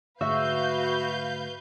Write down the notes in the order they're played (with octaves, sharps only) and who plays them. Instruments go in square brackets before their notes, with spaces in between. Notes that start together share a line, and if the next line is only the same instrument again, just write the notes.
[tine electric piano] G#2 D3 A3 [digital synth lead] F#4 [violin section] B4 F5 G6 [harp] E5